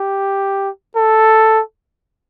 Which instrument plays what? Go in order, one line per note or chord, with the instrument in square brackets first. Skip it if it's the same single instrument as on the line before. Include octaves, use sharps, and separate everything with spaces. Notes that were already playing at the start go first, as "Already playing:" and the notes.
Already playing: [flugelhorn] G4
A4